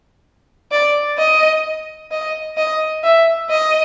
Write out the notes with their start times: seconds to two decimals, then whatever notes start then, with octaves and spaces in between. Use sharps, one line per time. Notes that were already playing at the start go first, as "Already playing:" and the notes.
0.72 D5
1.18 D#5
2.11 D#5
2.57 D#5
3.04 E5
3.50 D#5